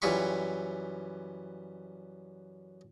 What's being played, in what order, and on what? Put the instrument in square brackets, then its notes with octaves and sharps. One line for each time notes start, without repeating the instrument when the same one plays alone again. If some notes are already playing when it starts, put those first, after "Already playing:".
[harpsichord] F#2 E3 G3 F4 B5 C#6